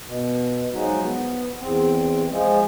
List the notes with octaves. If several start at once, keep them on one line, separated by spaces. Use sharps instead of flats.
B2
F3 F#3 G#3 D#4 F#4
B3
E2 C4
F3 G#3